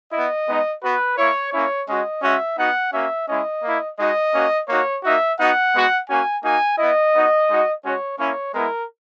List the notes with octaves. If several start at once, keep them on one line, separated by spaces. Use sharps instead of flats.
B3 E4 D#5
G#3 B3 D#4
B3 F#4 B4
A#3 E4 C#5
A#3 C#4 E4 C#5
G#3 C#4 F#4 D#5
G#3 C#4 F#4 E5
B3 D#4 F#4 F#5
A#3 C#4 F#4 E5
G#3 C#4 E4 D#5
A#3 E4
G#3 D#4 F#4 D#5
A#3 C#4 F#4
A#3 D#4 F#4 C#5
A#3 D#4 F#4 E5
B3 D#4 F#4 F#5
G#3 B3 F#4
A#3 C#4 F#4 G#5
A#3 D#4 F#4 G#5
B3 E4 D#5
B3 D#4 F#4
G#3 D#4 F#4
G#3 C#4 F#4 C#5
A#3 C#4 E4 C#5
G#3 B3 E4 A#4